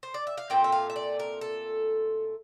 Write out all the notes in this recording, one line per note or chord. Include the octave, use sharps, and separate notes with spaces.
C5
D5
E5
F5
A#2 A3 C4 G5
E5
F5
E5
D5
A#4
A4